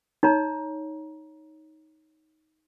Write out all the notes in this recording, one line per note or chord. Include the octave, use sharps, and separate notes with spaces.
D#4 C#5 A#5